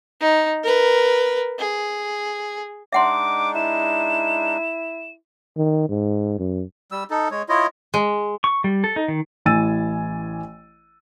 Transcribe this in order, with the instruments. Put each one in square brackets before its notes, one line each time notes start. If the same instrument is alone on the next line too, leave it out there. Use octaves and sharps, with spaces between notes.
[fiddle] D#4
A#4 B4
G#4
[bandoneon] G#3 D4 D#4 [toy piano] E5 F#5 C6 [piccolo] D6
[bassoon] E4 [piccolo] E7
[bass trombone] D#3
G#2
F#2
[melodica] G3 E6
D#4 A4
G#3 C#5
E4 F4 C#5 D#5
[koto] G#3
[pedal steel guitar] C#6
G3
A4
D#4
D#3
[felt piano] A1 E3 G#5 E6 A6 D#7